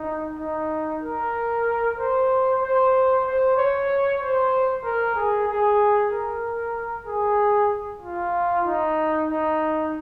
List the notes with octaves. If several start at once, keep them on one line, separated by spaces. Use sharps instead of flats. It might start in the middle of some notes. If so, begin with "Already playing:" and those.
Already playing: D#4
D#4
A#4
C5
C5
C5
C#5
C5
A#4
G#4
G#4
A#4
G#4
F4
D#4
D#4